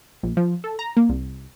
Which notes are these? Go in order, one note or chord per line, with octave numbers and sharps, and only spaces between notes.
A#1
F3
A4
A#5
A#3
C2